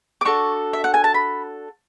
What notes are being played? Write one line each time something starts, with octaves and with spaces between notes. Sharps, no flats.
D6
D4 F#4 A4 C#6
E5
F#5
G#5
A5
B5